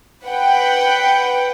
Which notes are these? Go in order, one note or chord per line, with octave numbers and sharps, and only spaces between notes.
B4 F#5 G5